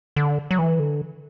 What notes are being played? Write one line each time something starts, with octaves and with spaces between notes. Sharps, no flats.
D3
F#3
E3
D3